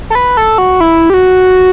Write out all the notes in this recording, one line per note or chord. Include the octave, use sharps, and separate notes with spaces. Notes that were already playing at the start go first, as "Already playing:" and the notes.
A4
B4
A4
F#4
E4
G4
F#4